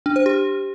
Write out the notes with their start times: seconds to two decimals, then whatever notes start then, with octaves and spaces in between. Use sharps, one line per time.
0.06 D4
0.16 C5
0.26 G4